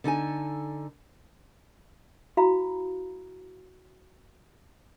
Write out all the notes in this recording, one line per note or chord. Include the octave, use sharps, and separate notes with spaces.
D3 D#4 A4 G#5
E4 F#4 F5 A#5 B5